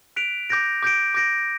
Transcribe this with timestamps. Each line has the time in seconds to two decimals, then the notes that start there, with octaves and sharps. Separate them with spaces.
0.16 F#6 B6 D7 F7
0.49 D6 G6 A#6 D7
0.83 D6 G6 A#6 D7
1.15 D6 G6 A#6 D7